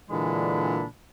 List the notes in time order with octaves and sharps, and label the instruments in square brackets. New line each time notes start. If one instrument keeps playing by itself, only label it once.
[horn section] A#2 D3 E3 G#3 D4 B5